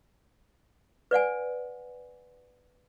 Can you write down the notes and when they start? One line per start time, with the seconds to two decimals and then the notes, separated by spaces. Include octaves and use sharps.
1.11 B4 D5 F#5 G#5